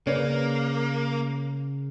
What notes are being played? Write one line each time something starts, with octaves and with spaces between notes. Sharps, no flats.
C#3 A#3 B4 C#5 D5